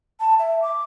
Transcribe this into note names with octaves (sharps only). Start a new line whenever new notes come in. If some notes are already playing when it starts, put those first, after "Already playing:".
A5
E5
D6